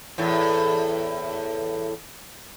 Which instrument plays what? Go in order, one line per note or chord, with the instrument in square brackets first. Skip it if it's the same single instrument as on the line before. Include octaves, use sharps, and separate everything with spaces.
[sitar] E2 A2